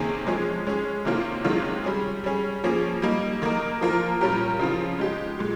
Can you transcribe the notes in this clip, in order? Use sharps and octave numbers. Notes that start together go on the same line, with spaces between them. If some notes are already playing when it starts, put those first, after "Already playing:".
Already playing: C3 D#3 A#3 C#4 G#4
F3 G#3 C#4 G#4
G#3 C#4 G#4
C3 D#3 A#3 C#4 F4
C3 D#3 G#3 C#4 F4
G3 C#4 G#4
G3 C#4 G#4
F3 A#3 C#4 G#4
G3 A#3 D#4
D#3 A#3 D#4 A#4
F3 A#3 F4 A#4
A#2 G3 C#4 G4 A#4
C#3 F3 C4 F4
G#3 D#4 G4
A#2 G#3